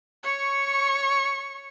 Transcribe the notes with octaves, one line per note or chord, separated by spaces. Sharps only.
C#5 C#6